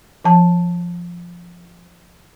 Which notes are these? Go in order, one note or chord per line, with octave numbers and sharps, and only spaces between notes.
F3 A5